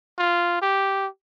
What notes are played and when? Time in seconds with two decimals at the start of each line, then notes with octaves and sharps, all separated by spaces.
0.18 F4
0.62 G4